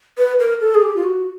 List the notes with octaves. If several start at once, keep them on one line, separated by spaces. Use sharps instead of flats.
B4
A#4
A4
G#4
G4
F4
F#4